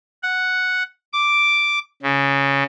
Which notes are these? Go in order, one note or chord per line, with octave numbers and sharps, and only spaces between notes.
F#5
D6
C#3